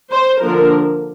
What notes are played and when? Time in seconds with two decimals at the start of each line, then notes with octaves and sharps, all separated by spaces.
0.09 C5
0.41 D3 F3 A#3 D4 A#4